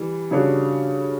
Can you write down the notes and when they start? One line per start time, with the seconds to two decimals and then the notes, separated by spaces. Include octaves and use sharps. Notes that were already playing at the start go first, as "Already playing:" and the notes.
Already playing: E3 G3
0.31 C#3 G3 D4 F#4 C#5